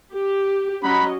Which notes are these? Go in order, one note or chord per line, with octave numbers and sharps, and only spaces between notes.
G4
F#3 C#4 D#5 F#5 A#5 B5